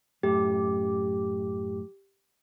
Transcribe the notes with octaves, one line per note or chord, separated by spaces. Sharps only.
F#2 A2 A3 G4